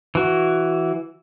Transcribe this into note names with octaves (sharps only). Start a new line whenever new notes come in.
E3 F#4